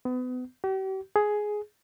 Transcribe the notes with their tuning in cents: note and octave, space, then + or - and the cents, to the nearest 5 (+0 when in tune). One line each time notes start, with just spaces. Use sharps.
B3 +35
G4 -45
G#4 +10